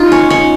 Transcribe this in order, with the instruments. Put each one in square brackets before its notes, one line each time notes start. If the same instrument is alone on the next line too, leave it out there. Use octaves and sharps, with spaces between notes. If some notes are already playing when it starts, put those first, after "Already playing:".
Already playing: [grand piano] D#4 [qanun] F4
[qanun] C#4
[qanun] C#4 [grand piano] D#4